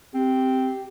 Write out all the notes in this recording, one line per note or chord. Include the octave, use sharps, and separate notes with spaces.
C4 G4